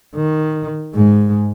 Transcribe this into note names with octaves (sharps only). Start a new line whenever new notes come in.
D#3
G#2 G#3